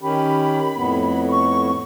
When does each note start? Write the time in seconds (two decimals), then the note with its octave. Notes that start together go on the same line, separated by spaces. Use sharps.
0.01 D#3 C#4 G4 B5
0.77 F2 A2 B3
1.29 C#6